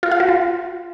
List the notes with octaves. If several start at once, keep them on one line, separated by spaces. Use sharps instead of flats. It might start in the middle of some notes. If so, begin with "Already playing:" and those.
F4
F5
F#4
F4